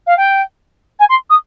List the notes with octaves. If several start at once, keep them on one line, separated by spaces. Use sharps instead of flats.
F5
G5
G#5
C6
D#6